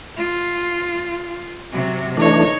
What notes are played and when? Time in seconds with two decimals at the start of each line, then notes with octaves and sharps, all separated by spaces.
0.17 F4
1.73 C3 F#3
2.17 E3 A3 D4 D#4 C#5